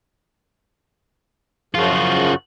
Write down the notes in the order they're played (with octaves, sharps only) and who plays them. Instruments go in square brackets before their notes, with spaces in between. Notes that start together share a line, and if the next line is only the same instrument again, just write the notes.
[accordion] F#2 C#3 F3 [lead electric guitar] F4 F#4